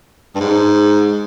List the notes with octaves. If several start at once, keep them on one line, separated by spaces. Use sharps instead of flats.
G2
G#2